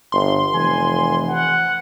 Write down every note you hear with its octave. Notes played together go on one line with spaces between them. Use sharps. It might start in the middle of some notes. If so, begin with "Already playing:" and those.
G1 C6
F1 E3 G#5
F#5